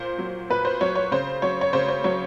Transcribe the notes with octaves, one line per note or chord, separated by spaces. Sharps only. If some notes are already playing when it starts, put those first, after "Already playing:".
Already playing: A#2 C5
F#3
A#2 B4
C5
F#3 C#5
C#5
C#3 C5
F#3 C#5
C#5
C#3 C5
C5
F#3 C#5